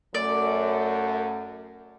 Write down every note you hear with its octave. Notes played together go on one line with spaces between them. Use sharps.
F#2 A3 D5